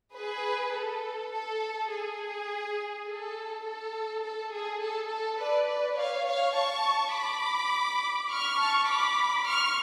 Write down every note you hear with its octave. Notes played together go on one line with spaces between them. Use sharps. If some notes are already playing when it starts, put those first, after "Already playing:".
G#4 B4
A4
A4
G#4
A4
A4
A4
G#4
A4
A4
B4 D5
B4 D5
C#5 F5
C#5 F5
A5 C#6
B5 D6
C#6 F6
A5 C#6
B5 D6
C#6 F6